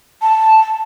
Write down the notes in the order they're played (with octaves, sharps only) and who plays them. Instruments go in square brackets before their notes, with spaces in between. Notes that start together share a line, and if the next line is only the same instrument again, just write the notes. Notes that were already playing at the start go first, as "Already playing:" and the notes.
[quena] A5